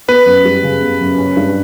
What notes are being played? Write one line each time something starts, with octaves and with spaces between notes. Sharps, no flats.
B3 B4
F#2
G3
C#3
B3
F#2
C#4
G2